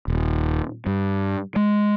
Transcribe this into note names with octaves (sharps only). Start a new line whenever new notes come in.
D#1
G2
G#3